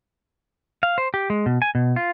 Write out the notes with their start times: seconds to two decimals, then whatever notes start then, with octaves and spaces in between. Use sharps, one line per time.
0.83 F5
0.98 C5
1.14 G4
1.30 G#3
1.46 B2
1.62 G#5
1.75 B2
1.96 F4